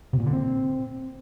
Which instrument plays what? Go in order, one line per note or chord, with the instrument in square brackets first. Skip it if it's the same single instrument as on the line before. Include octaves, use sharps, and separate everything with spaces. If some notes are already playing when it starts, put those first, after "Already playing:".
[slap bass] C3
A#2
D3
C4